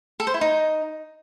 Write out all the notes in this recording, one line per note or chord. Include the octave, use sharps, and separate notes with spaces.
A4
C5
E4
D#4